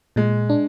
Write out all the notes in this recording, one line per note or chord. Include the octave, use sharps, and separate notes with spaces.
A#2 G#3
D4